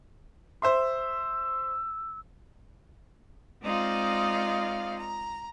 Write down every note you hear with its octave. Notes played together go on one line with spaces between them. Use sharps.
C5 E5 C6 E6
G#3 C4 D#4 F4 D5 F5
A#5